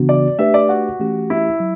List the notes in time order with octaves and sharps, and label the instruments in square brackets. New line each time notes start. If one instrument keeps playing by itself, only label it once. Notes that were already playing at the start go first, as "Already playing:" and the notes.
Already playing: [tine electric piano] C#3 E3 B3 D4 F#4
[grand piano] D5
[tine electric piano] A3 D4 G4 B4 [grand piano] E5
[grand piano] D5
F#4
[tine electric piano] E3 A3 C#4 G4
[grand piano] E4
[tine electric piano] F#3